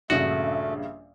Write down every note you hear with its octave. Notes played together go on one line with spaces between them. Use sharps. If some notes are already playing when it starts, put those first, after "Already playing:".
A#1 G2 C#3 A3 F#4